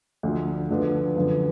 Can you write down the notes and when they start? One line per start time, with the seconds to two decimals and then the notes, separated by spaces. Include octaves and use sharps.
0.23 D2 D3 F3
0.70 D2 D3 F3 B3
1.16 F#2 D3 F3 B3